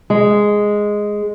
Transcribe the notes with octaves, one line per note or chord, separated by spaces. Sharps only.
G#3